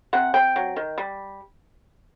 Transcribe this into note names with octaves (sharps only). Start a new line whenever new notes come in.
C3 F#5
C3 G5
F#3
D#3
G3